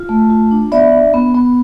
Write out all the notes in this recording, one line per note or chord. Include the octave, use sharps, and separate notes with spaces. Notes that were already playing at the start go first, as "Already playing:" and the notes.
Already playing: F4
A3
F4
D4
B3 D5 E5
D4
B3
B3